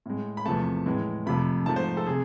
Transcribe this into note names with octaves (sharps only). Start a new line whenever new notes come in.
A2 G#3
B5
E2 C3 F3 A3 A5
A2 E3 G#3
F2 C3 F3 A3 B5
G#2 F3 A3 A5
C5
A4
C3 G#4